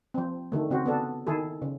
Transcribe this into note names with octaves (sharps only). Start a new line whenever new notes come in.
F3 C4
D3 D#3 A3
C#3 C4 F#4
B3 D4 A4
D#3 E4 G#4 A4
C#3